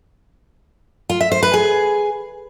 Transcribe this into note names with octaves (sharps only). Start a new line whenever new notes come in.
F4
E5
C5
B4
G#4